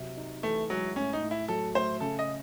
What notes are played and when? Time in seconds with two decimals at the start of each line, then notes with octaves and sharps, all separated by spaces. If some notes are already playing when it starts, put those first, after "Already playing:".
Already playing: C3 F#3
0.17 D#4
0.43 E3 A3
0.70 F#3 G#3
0.96 A2 C#4
1.13 D#4
1.22 A2
1.31 E4
1.48 F#3 A4
1.75 A3 C5
2.00 C#3 A4
2.19 D#5